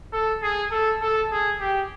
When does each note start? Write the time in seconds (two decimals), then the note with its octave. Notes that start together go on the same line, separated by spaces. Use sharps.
0.13 A4
0.43 G#4
0.71 A4
1.01 A4
1.32 G#4
1.60 G4